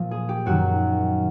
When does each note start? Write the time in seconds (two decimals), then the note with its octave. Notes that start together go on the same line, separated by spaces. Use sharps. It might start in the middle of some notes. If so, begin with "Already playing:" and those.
Already playing: A#2 F3
0.11 G#4
0.29 G4
0.46 F#2 D#3 F#4